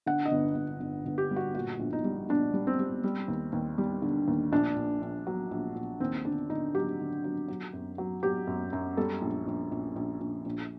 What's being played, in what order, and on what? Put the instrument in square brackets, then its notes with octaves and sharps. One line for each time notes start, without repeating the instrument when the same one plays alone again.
[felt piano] D3 F#5
D#5
G1
G1
G1
G1
G4
G3
F#4
A#2 F#4
A#1
D#4
G3
A#1 D4
G3
C4
G3
G3
D#2
D#2
G3
D3
D#2
A#1 D4
A#1
A#1
F#3
A#1
A#1
D#2 C4
D3 D4
D3 D#4
F#3 G4
D3
F#3
F#3
F#2
F#3
F#3 G4
F#2
F#2
G3 A4
A#1
A#1
A#1
A#1
A#1
A#1